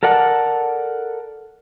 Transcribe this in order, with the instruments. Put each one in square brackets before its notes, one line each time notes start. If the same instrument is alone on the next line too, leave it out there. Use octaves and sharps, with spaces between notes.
[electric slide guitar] A4 A#4 D5 F#5 A5